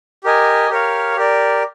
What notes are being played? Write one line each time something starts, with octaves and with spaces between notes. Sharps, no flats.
G4 A#4 D#5 G#5
G4 A#4 C#5 F5
G4 A#4 D5